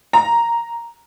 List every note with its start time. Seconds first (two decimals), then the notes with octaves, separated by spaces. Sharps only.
0.13 A#5